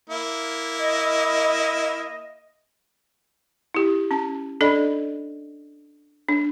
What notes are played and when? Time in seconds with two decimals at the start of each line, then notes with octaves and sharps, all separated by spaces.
0.10 A#3 E4
0.77 D#5
3.75 E4 G4
4.11 C#4 A5
4.61 D4 A4 D5 D#5 B5
6.29 D4